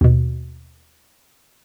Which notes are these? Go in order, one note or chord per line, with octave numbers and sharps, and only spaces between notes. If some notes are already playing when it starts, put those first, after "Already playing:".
D#2 B2